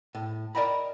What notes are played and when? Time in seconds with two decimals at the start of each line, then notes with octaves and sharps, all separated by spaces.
0.15 A2
0.55 A#4 D5 D#5 G5 A#5 B5